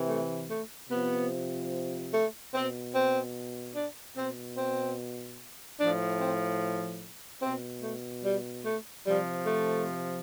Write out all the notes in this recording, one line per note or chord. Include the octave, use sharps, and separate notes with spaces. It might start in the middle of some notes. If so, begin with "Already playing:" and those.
Already playing: C3 E3
A3
A3
C3 F3 B3
A3
B2 C4
C4
D4
B2 C4
C4
A2 F3 D4
C4
B2 C4
A3
G3
A3
C3 F3 G3
A3